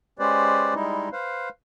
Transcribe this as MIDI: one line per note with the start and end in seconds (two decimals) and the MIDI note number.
0.19 0.74 56
0.19 0.74 61
0.19 0.74 67
0.19 0.74 71
0.19 0.74 72
0.19 0.74 74
0.75 1.09 55
0.75 1.09 56
0.75 1.09 63
0.75 1.09 64
1.12 1.49 71
1.12 1.49 72
1.12 1.49 77